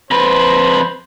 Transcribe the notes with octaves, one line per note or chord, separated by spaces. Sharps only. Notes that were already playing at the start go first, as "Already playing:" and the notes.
F2 B4 C5